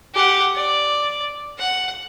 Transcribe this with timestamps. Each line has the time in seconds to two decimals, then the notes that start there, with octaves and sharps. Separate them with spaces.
0.14 G4 F#5
0.56 D5
1.58 F#5